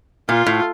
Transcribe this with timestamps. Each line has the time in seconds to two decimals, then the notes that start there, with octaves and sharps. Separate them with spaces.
0.29 A#2 F4
0.47 A2